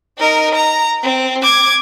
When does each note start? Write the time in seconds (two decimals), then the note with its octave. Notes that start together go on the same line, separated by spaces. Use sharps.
0.18 D#4 A#4
0.54 A#5
1.03 C4
1.42 D6 G#6